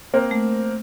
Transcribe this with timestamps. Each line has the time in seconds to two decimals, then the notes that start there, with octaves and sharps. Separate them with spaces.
0.14 A#3 C4 A#4
0.31 A3